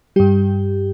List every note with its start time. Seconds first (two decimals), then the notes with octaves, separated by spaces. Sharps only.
0.16 G2 G3 G4